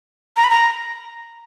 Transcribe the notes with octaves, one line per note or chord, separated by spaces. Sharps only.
A#5
B5
A#5